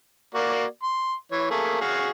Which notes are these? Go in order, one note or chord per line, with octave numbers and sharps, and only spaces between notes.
A#3 F#4 D5
C6
E3 C#5
A3 A#3 G#4
F#4 G#4 F5